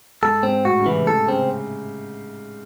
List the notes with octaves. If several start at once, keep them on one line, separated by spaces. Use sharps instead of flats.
G#2 A4
G#2 C4
A2 F#4
C#3
C3 E3
A2 A4
C#3 C4